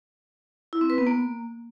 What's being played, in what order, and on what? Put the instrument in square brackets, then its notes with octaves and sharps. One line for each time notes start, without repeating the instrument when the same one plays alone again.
[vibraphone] E4
C4
B4
B3
A#3